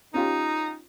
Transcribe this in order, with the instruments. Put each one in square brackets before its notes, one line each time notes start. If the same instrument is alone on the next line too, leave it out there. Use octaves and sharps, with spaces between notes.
[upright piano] C#4 F4 G4 [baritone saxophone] D#4